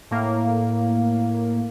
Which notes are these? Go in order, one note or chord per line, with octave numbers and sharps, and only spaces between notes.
A2 A#3